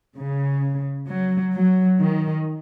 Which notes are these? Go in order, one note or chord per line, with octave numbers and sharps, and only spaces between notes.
C#3
F#3
F#3
D#3